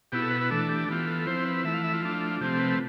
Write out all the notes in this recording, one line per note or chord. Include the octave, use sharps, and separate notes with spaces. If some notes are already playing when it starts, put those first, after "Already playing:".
B2 B3 E4 G4
A4
B4
B4
E3 A3 D4 A4
G4
E3 B3 F4 G4
A4
F3 C4 E4 C5
B4
E3 A3 E4 E5
F5
E5
F4
F3 A3 D4
C3 F3 A3 C4 G4
B4